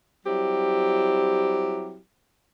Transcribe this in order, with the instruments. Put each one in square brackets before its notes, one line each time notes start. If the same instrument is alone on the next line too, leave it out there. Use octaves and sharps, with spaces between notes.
[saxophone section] F#3 G3 C4 E4 G4